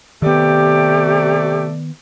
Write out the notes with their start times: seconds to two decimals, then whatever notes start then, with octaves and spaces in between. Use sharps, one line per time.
0.22 C3 D#3 A3 B3 G4 D5